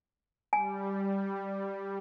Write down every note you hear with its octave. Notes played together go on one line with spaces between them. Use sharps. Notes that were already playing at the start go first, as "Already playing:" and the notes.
G3 G#5